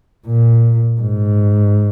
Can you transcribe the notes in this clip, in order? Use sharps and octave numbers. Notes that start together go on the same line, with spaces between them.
A#2
G#2